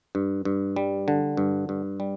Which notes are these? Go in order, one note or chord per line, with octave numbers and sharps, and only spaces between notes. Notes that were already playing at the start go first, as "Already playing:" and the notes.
G2
G2
G3
D3
G2
G2
G3